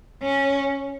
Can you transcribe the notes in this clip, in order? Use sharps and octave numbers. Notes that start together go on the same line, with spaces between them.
C#4